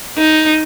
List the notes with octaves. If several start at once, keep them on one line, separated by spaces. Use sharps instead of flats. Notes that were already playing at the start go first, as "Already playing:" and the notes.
D#4